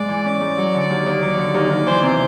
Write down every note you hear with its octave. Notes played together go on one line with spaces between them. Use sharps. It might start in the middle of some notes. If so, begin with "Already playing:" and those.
Already playing: G#2 G#3 D5
E3
C#4
G#2
F#3
D3
D#2
D#2
F#3
D3
D#2
D#2
E3 C5
C3